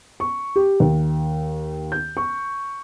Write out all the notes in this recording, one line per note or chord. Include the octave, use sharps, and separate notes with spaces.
C#6
G4
D#2
G6
C#6